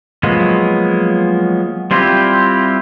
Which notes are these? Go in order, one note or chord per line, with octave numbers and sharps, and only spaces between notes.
F3 F#3 G#3 A#3 B3
G3 C4 E4 F4 G4